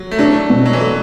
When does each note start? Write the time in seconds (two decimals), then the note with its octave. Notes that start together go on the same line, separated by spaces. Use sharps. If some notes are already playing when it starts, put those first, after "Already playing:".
Already playing: F#3
0.11 A3
0.19 F#3 D4
0.50 B2
0.66 F#3
0.73 E3
0.80 F#3 A3